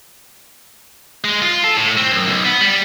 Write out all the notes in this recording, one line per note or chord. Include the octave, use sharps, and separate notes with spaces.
G#3
F4
A4
A2
C4
F#2
B1
B3
G3